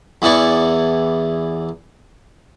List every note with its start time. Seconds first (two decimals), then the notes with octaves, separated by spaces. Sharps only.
0.22 E2 E3 B3 D5 C#6